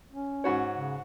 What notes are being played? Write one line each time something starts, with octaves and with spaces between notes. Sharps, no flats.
C#4
G#2 F#4 C#5
C#3